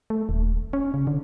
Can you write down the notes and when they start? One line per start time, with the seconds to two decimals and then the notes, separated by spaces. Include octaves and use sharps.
0.10 A3
0.29 D#1
0.73 C#4
0.94 C#3
1.07 D3